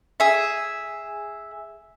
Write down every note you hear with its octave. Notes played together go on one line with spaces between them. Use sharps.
G#4 E5